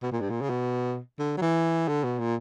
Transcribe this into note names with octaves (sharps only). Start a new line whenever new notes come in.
B2
A#2
G2
A#2
C#3
B2
D3
F#3
E3
D3
B2
A#2